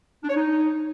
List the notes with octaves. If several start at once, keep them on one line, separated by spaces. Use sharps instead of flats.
D4
C#5
D#4